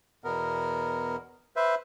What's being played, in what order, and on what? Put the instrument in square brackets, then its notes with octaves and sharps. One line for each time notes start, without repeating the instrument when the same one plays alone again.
[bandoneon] E2 B2 B3 A#4
B4 C5 E5